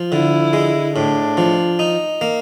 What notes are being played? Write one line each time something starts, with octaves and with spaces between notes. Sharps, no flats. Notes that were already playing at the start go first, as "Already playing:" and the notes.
Already playing: F3
D3 E4
G#3
A2 D4
F3
D#4
A#3